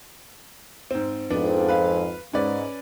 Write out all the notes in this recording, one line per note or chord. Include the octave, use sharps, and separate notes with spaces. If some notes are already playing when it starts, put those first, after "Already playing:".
G#2 C4
F2 G#2 B3 D4
B4 F5
G#2 C#4 B4 D5